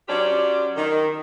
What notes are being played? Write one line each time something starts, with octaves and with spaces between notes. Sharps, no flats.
F#3 C#4 F4 G4 C5 D5
D#3